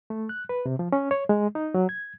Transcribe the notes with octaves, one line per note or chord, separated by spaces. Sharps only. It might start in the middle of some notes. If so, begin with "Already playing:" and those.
A3
F#6
B4
C3
F3
C#4
C#5
G#3
D#4
F#3
G#6